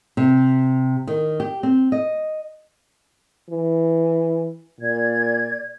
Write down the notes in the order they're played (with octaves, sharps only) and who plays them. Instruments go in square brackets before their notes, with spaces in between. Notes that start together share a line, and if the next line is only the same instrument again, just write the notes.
[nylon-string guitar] C3
D#3
G4
C4
D#5
[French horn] E3
[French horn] A#2 [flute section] D5 G#6